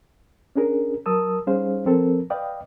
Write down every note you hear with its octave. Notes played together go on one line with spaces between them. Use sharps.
C#4 D4 G#4 A#4
F#3 A#4 A5 D#6 E6
G3 C#4 D#4 G#4 C5 F5
F3 C4 A4 A#4
B4 D5 D#5 F5 G5